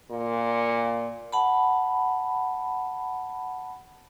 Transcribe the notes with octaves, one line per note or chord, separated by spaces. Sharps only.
A#2
F#5 A5 B5